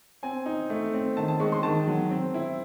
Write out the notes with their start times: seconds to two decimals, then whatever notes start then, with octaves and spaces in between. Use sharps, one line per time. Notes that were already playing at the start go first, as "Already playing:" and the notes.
0.23 C4 G#5
0.46 D#4
0.70 A3
0.94 C4
1.17 D#3 A5
1.28 A5
1.40 G#3 C#6
1.52 C6
1.63 D#3 A5
1.87 F#3
2.10 C4
2.34 E4